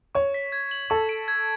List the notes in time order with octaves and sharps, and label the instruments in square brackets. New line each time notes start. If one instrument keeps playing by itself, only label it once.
[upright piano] C#5 [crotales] C#6
[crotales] B6
G#6
F#7
[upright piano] A4 [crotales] C#6
[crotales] D7
G#6